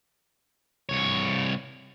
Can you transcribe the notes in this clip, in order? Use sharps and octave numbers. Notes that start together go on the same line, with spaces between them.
C2 C#5